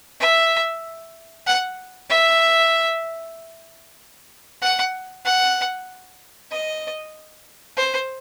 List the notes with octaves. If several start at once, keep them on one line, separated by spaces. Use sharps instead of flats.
E5
F#5
E5
F#5
F#5
D#5
C5